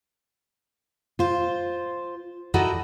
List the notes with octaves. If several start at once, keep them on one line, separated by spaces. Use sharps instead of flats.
F4 C5
D#4 E4 F#4 A4 D5 D#5